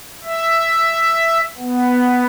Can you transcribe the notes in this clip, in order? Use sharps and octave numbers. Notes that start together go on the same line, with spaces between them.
E5
B3